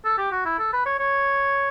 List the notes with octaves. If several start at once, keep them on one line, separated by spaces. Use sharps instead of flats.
A4
G4
F#4
E4
A4
B4
C#5
C#5